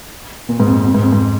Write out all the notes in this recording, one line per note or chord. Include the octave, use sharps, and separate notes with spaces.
A#2
G#2
F2
F2
G#2
F2
G#2